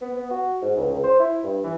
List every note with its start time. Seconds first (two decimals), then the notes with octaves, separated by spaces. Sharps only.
0.01 B3
0.14 B3
0.30 F#4
0.62 G#2
0.77 C#2
0.92 C#2
1.04 C5
1.20 E4
1.43 G2
1.64 E3